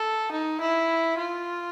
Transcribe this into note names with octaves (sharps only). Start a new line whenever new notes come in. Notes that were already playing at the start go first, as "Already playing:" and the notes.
Already playing: A4
D#4
E4
F4